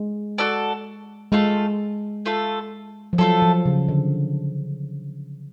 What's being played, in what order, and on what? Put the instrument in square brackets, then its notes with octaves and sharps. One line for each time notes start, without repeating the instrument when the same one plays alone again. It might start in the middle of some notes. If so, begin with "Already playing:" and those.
Already playing: [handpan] G#3
[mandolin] F#4 A4 D5
[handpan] G#3 [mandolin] A3 F4 A4
[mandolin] A3 F4 A4
[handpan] F3
[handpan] F#3 [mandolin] A3 F4 A4
[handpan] F3
C#3
D3